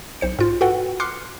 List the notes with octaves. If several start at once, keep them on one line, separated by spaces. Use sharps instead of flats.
B1 C5 C#7
G#2 F4
F#4 A4 B4 F#5 G5
C6 D6 F6 F#6 C7 C#7